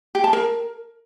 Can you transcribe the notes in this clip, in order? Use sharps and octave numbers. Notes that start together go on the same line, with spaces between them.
G4
A5
A#4